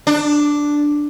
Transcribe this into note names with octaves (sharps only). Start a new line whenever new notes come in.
D4